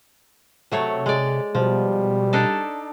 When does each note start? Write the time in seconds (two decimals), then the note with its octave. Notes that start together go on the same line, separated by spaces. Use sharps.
0.72 C3 F#3 A3 C#5
1.06 G#3 D5
1.55 B2 F3 G3
2.33 D4 D#4 A4